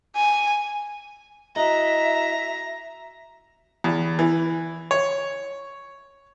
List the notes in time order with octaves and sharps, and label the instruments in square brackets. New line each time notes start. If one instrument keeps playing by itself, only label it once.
[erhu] G#5
[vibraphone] E4 F#4 [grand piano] D#5 [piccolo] E5 [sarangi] A#5
[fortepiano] E2
E3
C#5